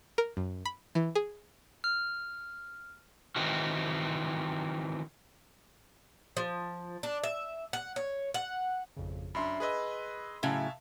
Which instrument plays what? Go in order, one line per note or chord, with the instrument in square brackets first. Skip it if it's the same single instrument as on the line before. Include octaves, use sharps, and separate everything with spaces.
[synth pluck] A#4
F#2
B5
E3
G#4
[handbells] F6
[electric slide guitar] D#3 E3 C4 F#4
[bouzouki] F3
D4
E5
F#5
C#5
F#5
[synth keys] G#1 F2 C#3
[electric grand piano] F#2 C6 [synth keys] D4 E5 B5
[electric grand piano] G#4 B4 D#5 [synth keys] B5 C6 E6
[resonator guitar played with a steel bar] A2 C#3 F#3 [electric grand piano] E5 F5 A5